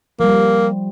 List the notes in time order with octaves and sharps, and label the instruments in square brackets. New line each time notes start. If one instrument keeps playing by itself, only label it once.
[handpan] F3 G3 [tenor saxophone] A#3